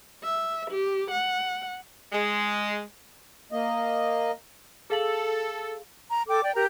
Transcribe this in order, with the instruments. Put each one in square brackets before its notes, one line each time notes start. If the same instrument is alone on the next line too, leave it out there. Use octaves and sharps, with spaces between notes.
[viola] E5
G4
F#5
[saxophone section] G#3
[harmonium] A#3 D#5
[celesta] G#4 F5 F#7 [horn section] A4
[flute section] A#5
A4 G5 D6
D5 G5
G4 A#4 A#5